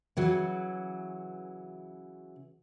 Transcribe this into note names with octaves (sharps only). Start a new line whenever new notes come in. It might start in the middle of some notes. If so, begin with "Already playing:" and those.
C#3 E3 F#3